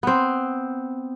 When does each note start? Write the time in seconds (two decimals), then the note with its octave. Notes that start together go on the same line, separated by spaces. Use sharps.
0.03 B3 C4